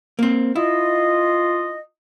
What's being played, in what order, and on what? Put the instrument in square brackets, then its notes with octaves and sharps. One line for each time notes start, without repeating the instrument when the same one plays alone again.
[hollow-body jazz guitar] A#3 C4
[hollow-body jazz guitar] E4 [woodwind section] F4 D#5